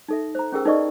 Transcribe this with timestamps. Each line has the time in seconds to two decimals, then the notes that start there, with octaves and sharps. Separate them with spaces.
0.09 D#4 A4 E5
0.35 C5 A#5
0.52 C#4 G4 G#4 A#4 G5 E6
0.65 D#4 A4 B4 D5 D#5 C#6